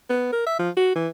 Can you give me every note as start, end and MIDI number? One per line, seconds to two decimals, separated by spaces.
0.09 0.28 59
0.32 0.44 70
0.46 0.57 76
0.59 0.70 53
0.77 0.91 66
0.95 1.08 52